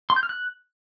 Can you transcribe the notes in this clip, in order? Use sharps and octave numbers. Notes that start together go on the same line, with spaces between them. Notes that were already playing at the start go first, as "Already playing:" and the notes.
C6
G6
F6
F#6